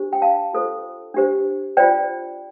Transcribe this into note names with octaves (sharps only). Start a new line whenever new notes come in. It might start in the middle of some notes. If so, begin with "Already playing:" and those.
Already playing: D4 G4 C5
G5
F5 A5
F4 A4 C5
D4 G4 C5
F4 C5 D5 G5